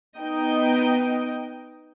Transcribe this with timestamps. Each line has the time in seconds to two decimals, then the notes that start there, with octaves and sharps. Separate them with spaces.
0.18 B3 D#4 D#5 G5